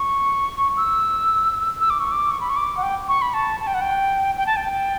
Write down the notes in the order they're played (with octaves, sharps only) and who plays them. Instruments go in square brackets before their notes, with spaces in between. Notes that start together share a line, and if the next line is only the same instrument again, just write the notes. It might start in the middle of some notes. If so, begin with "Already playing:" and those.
Already playing: [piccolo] C#6
E6
E6
D6
C#6
D6
C#6
B5
C#6
D6
F#5
G5
C#6
B5
A5
A5
G5
F#5
G5
G5
A5
G5